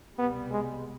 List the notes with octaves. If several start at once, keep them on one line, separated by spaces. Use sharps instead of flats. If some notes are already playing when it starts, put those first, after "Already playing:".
C2 B2 G3 B3
G#3